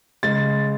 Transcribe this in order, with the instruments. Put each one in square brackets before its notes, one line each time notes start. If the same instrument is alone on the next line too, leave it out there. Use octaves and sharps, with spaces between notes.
[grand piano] C#3 G#3 A6